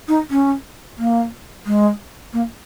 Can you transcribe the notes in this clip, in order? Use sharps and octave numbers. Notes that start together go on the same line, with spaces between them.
D#4
C#4
A#3
G#3
A#3